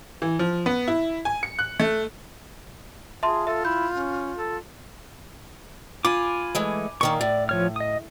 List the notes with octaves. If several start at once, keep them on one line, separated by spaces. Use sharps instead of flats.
E3
F3
B3
E4
G#5
C#7
F#6
A3
F4 G#4 E5 A5 C6
A4 E5
E4 G6
C#4
A4
F4 G#5 B5 D6
E3 G#3 A3
A#2 D#3 A#3 C#6
A2 D5
F3 C#5 F6
D#5 D#6